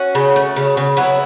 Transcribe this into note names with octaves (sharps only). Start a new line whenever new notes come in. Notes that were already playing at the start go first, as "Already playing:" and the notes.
Already playing: C#4 F#4
C#3
A3
C#3
C#3
F#3 B3 E4